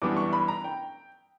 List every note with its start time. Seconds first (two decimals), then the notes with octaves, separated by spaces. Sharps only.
0.02 F#2 E3 G3 B3 D4 D6
0.17 C#6
0.33 B5
0.48 A#5
0.64 G5